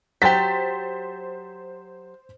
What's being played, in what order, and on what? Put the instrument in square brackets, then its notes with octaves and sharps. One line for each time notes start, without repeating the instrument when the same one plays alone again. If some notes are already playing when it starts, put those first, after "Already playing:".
[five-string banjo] F#3 G4 [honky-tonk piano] C5 A6 B6